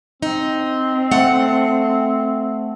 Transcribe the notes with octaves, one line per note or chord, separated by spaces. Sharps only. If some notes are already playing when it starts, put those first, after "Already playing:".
C4 D#4
A3 F#5